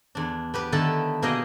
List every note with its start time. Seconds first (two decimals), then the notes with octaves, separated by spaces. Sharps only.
0.15 E2 D4
0.54 B3 G4 B4
0.72 D3 D#3 B3 E4 A4 A5
1.22 B2 A#3 G#4 D#5 G5 A#5